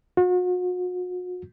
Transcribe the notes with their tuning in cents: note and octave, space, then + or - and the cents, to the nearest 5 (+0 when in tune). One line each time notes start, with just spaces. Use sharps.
F#4 -40